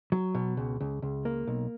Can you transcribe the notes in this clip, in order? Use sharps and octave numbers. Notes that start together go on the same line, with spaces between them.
F#3
B2
C#2
C#2
C#2
A#3
B1